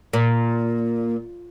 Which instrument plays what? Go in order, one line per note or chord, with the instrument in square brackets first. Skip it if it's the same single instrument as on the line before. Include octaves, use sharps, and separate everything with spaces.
[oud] A#2